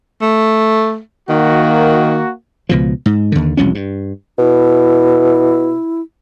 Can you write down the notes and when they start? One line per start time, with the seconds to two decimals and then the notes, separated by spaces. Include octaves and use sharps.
0.22 A3
1.30 D#3 A#3 F#4
2.69 C#2 B2 F3
3.06 G#2
3.32 D#2 D3
3.57 E1 C2 F3 C#4
3.75 G2
4.38 B2 E4